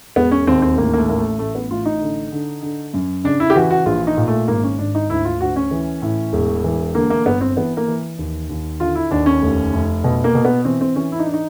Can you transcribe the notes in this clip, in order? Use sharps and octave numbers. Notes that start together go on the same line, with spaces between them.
E1 B3
C#4
D#2 C4
C4
A1 A#3
A#3
A3
A1 A#3
A3
A1 A3
B3
A1 F4
D#4
D3
D3
D3
F#2
C#3 D4
E4
G4
E3 F#4
F#4
A#1 F4
D#4
A#2
A3
G#1 A#3
C#4
G#1 D4
D#4
D2 E4
F4
D2 F#4
C#4
E3
A2
E1
E3
D3 A#3
A#3
G1 B3
C4
E3 B3
A#3
E3
D#2
D#2
D3 F4
E4
D#2 D4
C#4
F1
F1
B2
A#3
B2
B3
E3 C4
C4
E3 C#4
E4
D#4
D4
D#4